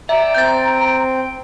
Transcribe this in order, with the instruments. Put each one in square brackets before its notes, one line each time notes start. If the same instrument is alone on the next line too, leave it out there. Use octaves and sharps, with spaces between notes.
[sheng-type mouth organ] D5 G5 E6 [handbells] E5 [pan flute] A#5
[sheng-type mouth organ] C4 G5 [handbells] G6 A6